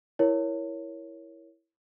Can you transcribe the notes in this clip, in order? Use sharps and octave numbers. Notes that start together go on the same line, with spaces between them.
E4 A#4 C#5